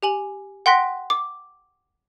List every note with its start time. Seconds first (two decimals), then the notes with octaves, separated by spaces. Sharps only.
0.03 G4 G#5 F#7
0.66 F#5 G5 C6 F#6 A#6 B6
1.10 D6